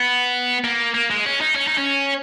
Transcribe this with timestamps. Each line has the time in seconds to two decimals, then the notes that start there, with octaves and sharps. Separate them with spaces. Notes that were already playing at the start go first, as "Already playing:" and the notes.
Already playing: B3
0.64 A#3
0.94 A#3
1.10 G#3
1.25 C#4
1.40 D#4
1.55 C#4
1.67 D#4
1.77 C#4